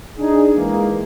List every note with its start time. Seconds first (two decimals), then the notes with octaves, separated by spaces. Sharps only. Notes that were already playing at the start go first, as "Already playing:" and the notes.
0.18 D4 D#4 G#4
0.55 E3 G#3 A#3